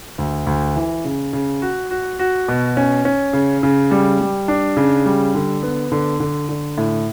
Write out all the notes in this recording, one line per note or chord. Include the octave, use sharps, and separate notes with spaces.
D2
D2
E3
C#3
C#3
F#4
F#4
F#4
B2
C#4
C#4
C#3
C#3
G3
G3
D4
C#3
G3
D3
B3
D3
D3
D3
A2